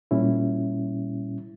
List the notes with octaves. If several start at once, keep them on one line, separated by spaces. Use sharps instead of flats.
A#2 G3 C#4 E4